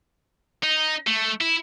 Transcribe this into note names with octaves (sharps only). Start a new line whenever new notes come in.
D#4
A3
E4